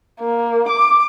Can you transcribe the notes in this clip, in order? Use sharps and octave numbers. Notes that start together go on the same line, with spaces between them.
A#3
D6